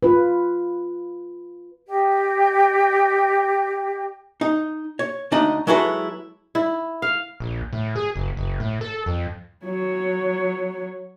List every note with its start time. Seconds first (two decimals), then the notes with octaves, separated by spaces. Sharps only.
0.03 F4 B4
1.88 G4 D#5 G5
4.41 D#4
4.99 C#5
5.32 D2 D4 D#4 D#5
5.67 F#3 G#3 E4 F#4 A4 B4
6.55 E4
7.02 F5
7.40 A#1
7.73 A2
7.96 G#4
8.16 F#1
8.37 F#1
8.60 A2
8.81 A4
9.06 F2
9.65 F#3 C#5